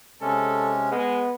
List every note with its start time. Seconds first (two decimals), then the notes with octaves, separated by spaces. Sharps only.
0.21 C3 G#3 C#4 A4
0.92 G#3 B3